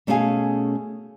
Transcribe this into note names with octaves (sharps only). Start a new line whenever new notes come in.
B2 A3 C#4 G#4 F5 G#5